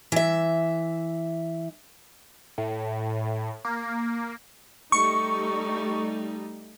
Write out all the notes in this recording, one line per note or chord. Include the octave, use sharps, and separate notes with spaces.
E3 E5
A2
A#3
G3 A3 D#4 C#6